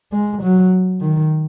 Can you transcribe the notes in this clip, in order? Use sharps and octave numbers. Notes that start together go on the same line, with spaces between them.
G#3
F#3
D#3